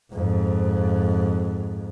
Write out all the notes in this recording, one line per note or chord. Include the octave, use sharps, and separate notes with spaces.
F2 G#2